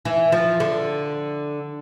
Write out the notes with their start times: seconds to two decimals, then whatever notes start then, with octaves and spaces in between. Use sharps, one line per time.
0.05 E3
0.32 F3
0.60 D3